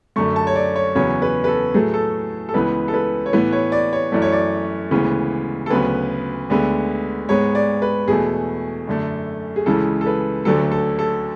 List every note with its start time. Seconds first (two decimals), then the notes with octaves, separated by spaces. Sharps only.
0.16 F#2 D3 A3 C#6
0.36 A5
0.47 C#5
0.55 D5
0.76 C#5
0.95 E2 C#3 F#3 B3 C#5
1.22 B4
1.44 B4
1.48 A4
1.74 A2 F#3 A3 G#4
1.94 A4
2.49 A4
2.54 C#2 C#3 E3 B3 B4
2.88 A4
2.94 B4
3.26 C#5
3.33 A2 E3 B3 B4
3.52 C#5
3.72 D5
3.93 C#5
4.12 F#2 E3 A3 D5
4.22 C#5
4.32 D5
4.91 D2 C#3 E3 G#3 B3
5.66 A4
5.70 D2 C#3 F#3 B3 B4
6.50 D2 D3 G#3 B3
7.29 G#2 G#3 B3 C#5
7.55 D5
7.82 B4
8.08 E2 B2 A3 G#4
8.87 F#2 D3 A3
9.56 G#4
9.66 C#2 C#3 E3 G#3 A4
10.01 A4
10.06 B4
10.45 D2 D3 F#3 A3 A4
10.71 A4
10.99 A4